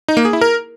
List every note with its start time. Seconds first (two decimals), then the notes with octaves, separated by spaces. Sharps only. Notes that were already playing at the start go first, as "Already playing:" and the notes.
0.08 D#4
0.17 A#3
0.25 G#4
0.33 E4
0.41 A#4